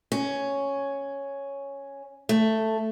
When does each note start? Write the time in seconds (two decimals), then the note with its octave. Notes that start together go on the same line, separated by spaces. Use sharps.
0.12 C#4
2.29 A3